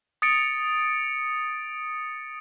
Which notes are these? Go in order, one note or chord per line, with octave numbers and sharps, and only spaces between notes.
D#6 A6 C#7 D7